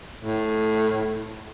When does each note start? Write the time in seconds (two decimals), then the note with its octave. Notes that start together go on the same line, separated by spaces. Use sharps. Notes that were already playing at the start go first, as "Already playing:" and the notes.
0.22 A2